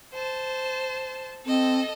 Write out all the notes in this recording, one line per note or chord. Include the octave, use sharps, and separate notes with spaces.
C5 A5
C4 A4 D#5